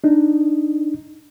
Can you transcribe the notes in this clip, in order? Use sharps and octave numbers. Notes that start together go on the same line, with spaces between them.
D4 D#4